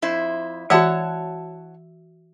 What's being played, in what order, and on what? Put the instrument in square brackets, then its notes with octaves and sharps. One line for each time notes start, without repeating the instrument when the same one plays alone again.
[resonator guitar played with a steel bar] F2 E4 C5
[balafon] E3 [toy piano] F#4 E5 E6 [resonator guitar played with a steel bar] C#5 F#5 A5